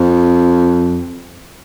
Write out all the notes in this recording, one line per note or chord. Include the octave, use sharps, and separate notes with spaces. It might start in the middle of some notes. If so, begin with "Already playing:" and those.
Already playing: F2